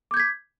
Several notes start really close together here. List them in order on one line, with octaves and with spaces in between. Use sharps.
D6 G6 G#6 B6